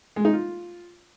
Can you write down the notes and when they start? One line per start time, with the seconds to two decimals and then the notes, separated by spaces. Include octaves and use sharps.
0.16 G#3
0.25 D#4
0.33 F4